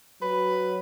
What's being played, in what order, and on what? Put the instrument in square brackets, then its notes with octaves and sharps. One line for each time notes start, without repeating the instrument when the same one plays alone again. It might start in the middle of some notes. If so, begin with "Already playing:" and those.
[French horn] F#3 [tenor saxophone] B4